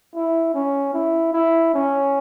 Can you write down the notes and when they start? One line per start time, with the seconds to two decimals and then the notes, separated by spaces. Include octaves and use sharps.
0.14 E4
0.54 C#4
0.94 E4
1.33 E4
1.74 C#4